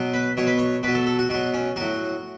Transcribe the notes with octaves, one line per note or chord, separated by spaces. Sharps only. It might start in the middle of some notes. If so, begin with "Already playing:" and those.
Already playing: B2 F#3
B4
B2 F#3 C#5
B4
C#5
B2 F#3 B4
A4
A4
F#4
B2 F#3 F#4
C#4
A2 F#3 F#4